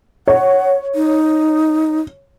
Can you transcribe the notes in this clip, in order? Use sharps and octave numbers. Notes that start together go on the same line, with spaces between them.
C#5 F#5
D#4